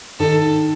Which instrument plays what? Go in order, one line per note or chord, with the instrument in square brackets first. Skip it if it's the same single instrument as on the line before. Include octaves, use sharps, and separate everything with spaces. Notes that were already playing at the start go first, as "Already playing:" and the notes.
[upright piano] D#3 [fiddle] A4